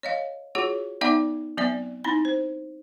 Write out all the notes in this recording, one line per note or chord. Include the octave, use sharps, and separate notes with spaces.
C#5 D#5 F5
F4 F#4 G#4 C#5 F#5
B3 D#4 D5 E5 F#5 D6
F#3 B3 C4 D5 E5
C4 D#4 E4 B5
C5